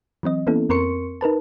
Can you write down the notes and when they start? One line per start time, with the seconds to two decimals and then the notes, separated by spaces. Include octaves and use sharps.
0.23 E3 F#3 C4 D#5
0.47 E3 A#3 B3 C#4 E4 A4
0.69 F2 C4 A#4 C6 C#6 C#7
1.21 D#4 A#4 B4 A5